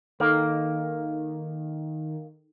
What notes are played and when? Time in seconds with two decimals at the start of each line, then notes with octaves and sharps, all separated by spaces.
0.20 D#3 A#3 D#4 A4